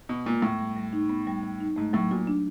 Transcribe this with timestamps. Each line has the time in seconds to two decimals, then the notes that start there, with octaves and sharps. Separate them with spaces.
0.09 B2 B3
0.26 A#2 G#3
0.42 A2 B3
0.59 G3
0.76 G3
0.93 D#4
1.10 B3
1.27 G3
1.43 G3
1.60 D#4
1.76 G#2 A3
1.93 A2 F#3
2.11 A#2 F#4
2.27 D4